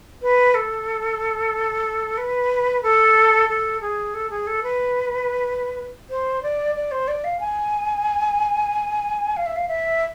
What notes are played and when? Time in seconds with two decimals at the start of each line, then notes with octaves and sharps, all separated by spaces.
0.22 B4
0.54 A4
2.18 B4
2.83 A4
3.49 A4
3.81 G#4
4.14 A4
4.30 G#4
4.47 A4
4.63 B4
6.10 C5
6.43 D5
6.75 D5
6.91 C5
7.08 D5
7.24 F5
7.40 G#5
9.37 F5
9.46 E5
9.56 F5
9.68 E5